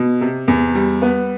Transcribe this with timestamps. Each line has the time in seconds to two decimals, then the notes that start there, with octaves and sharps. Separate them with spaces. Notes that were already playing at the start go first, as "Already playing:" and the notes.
Already playing: B2
0.21 C3
0.48 E2
0.75 G3
1.02 B3